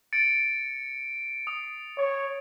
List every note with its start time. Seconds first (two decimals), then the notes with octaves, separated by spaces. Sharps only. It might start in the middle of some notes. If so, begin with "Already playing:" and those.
0.13 A6 C#7 D7
1.47 D#6
1.98 C#5